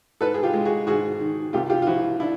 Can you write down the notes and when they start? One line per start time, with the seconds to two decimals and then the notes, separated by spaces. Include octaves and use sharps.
0.21 G#2 A4 B4
0.34 G#4
0.43 F4 G4
0.54 G#3
0.65 F#4 G#4
0.87 G#2 F#4 G#4
1.21 D#3
1.53 C2 F4 G4
1.70 F4 G4
1.82 F4
1.87 F3 E4 F#4
2.20 D4 E4